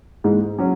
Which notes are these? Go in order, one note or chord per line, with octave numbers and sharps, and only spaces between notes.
G#2 E3 G#3
F#3 C#4